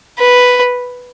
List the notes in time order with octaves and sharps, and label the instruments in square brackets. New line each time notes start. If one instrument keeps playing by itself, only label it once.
[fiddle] B4